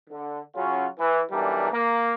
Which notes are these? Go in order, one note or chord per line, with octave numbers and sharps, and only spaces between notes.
D3
C#3 F#3 C#4 F4 F#4
E3
B1 E3 G3 D4 A#4
A#3